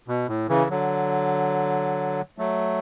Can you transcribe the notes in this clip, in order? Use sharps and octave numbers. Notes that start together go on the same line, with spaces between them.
B2
A2
C#3 E3
D3 F#3
F#3 A3